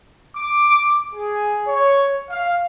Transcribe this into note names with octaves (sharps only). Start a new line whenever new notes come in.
D6
G#4
C#5
F5